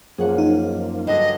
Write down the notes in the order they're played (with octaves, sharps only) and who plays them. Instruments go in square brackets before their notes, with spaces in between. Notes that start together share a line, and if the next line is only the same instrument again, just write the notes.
[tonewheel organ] F#2 F3 A#3 [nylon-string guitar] G#4 C#5 F#5
[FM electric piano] D#4
[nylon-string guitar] G2 D3 F#3 [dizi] D#5